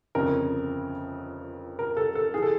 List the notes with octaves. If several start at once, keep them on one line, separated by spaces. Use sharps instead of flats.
G1 F2 C#3 A#4
A#4
A4
A4
E3 G#4
A4